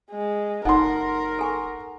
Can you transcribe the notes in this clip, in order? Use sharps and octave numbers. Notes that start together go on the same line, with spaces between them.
G#3
F#1 D#4 A4 A#4 F#5 C6
A4 G#5 C#6